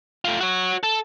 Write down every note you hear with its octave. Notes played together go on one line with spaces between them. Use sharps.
A3 F4
F#4 C#5
A4